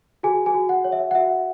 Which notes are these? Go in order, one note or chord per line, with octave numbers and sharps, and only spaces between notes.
F#4 G#4 G#5
G#4 G#5
F#4
F#5
C#5
E5
F#5
F#4 E5